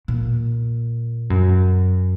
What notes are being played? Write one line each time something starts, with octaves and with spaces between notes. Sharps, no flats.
A#2
F#2